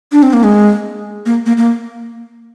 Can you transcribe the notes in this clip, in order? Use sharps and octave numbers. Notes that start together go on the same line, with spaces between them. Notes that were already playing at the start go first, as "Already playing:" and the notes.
D4
C4
A#3
G#3
A#3
A#3
A#3